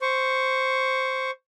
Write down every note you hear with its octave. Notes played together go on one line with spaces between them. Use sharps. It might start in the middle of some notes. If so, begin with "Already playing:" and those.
C5 C#6